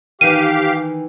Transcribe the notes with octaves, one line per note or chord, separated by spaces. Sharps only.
D#3 E3 G4 F5 D#7